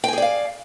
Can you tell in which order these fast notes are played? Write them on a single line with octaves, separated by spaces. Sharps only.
G5 G#5 G#4 D5 F5